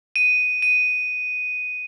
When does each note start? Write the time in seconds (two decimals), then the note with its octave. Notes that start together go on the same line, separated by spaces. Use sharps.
0.16 D#7
0.62 D#7